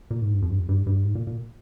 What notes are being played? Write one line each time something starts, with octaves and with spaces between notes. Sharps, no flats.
A#2
G#2
G2
F2
G2
F2
G2
G2
G#2
A#2
A#2